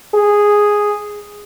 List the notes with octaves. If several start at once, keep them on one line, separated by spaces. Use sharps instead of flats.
G#4